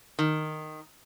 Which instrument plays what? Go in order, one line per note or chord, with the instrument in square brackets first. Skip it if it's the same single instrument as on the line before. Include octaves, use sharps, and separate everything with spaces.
[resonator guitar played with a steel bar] D#3